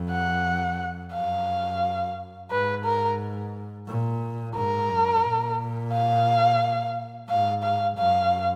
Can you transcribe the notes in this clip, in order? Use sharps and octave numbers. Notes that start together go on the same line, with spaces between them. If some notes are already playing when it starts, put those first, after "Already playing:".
Already playing: F2
F#5
F#2 F5
G#2 B4
A#4
A#2
G#2 A#4
F#2
A#2
F5
G#2 F5
F5
F#2 F5